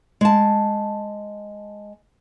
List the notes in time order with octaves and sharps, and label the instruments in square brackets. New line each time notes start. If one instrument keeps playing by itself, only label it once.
[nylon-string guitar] G#3 A5